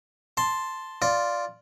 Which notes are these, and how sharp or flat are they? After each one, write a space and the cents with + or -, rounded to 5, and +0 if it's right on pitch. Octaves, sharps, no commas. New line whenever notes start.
A5 +0 C6 +0
F4 +0 D5 +0